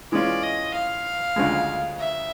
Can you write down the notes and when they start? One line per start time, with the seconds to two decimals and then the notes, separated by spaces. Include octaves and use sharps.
0.12 E3 G#3 C#4 F4 D5
0.43 D#5
0.74 F5
1.36 D2 C#3 F3 G#3
1.99 E5